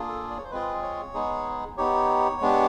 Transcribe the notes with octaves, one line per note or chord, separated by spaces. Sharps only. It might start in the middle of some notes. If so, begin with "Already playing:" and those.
Already playing: A#3 D4 F4 G#4
A4
D5
C#5
C5
G#3 C4 F4 G#4 B4
C#5
G#3 B3 D#4 G#4
B3 D#4 G4 C#5
G#3 B3 D4 G4